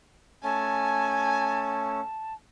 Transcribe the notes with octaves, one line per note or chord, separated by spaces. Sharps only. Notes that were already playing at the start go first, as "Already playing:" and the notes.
A3 C#4 G#5 A5